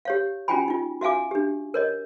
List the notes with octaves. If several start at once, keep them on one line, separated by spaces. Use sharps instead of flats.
G4 C#5 F5
C#4 F4 F#4 G5 G#5 B5
D#4 F4
F#4 E5 F5 G#5 D6
D4 G4
A#4 C#5 D#5